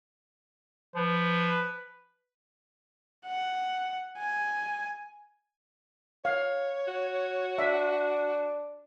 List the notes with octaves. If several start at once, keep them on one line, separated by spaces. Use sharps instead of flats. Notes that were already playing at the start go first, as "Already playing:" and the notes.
F3 B4
F#5
G#5
C#5 F5
F#4
D4 E5